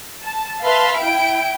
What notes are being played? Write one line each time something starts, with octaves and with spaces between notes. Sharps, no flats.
A5
B4 E5 F5 A5 B5 C6
E4 G5 D7